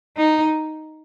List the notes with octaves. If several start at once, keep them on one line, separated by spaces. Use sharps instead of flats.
D#4